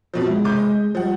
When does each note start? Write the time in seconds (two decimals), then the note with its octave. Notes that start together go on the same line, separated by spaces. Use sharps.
0.14 F2 B2 F3
0.27 G#3 E4
0.44 F1 D6 G6
0.56 D#5
0.95 F3 G3 F#5